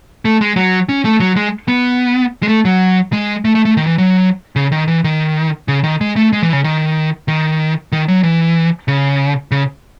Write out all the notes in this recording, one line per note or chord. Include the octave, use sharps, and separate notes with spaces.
A3
G#3
F#3
C#4
A3
F#3
G#3
B3
G#3
A3
F#3
G#3
A3
A3
A3
D#3
E3
F#3
C#3
D#3
E3
D#3
C#3
D#3
G#3
A3
G#3
E3
C#3
D#3
D#3
D#3
F#3
E3
C#3
C#3